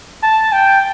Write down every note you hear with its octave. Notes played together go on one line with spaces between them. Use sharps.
A5
G5